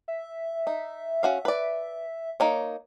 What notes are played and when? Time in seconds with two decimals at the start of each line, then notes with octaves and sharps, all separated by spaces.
0.08 E5
0.67 D#4
1.23 C#4 F#4 F5
1.45 B4 D5
2.40 A#3 D#4 C#5